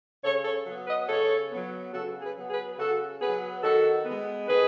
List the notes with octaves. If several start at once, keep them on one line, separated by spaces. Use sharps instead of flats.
C#3 A4 C#5
A4 C#5
F#3 B3
B4 D#5
C#3 A4 C#5
F#3 B3
C#3 F#4 A4
G#4 B4
F#3 B3
G#4 B4
C#3 F#4 A4
F#3 B3 G#4 B4
D#3 F#4 A4
B3
G#3
D#3 G#4 B4